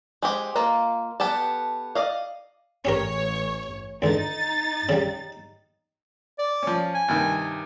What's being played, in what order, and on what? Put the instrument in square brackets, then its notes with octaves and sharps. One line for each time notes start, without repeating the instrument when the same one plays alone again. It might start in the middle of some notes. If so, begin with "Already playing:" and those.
[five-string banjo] G#3 C4 G4
A#3 F4 D#5
B3 G4 A4 A5
D5 D#5 F5
[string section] A1 C#5 [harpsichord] C#4 G4 A#4
[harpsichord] C#2 D3 [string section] D#4 A6
[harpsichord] C#3 G3
[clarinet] D5
[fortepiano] F3 C#4
[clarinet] G#5
[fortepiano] G2 C3 D#3